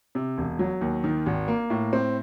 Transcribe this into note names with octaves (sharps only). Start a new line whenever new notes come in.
C3
E1
F#3
D#2
D#3
G#1
A#3
A2
C4